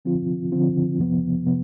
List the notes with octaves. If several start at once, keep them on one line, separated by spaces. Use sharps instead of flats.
D3 F3 C4 F4
D3 F3 C4 F4
F2 C3 F3 B3
C3 F3 B3